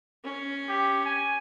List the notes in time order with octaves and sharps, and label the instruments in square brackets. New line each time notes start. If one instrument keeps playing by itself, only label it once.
[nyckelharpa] C#4
[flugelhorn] G4
G#5